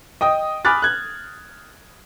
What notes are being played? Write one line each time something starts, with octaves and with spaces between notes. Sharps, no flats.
D#5 G5 D#6
G#5 B5 D6 F6 F#6 A6
F#6 G#6